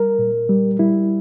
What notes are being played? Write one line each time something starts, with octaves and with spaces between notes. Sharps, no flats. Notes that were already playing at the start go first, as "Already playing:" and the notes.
Already playing: G3 A#4
A#2
G3
G3 E4